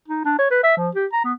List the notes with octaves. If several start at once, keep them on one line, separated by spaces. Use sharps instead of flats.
D#4
D4
C#5
B4
E5
F3
G4
A#5
B3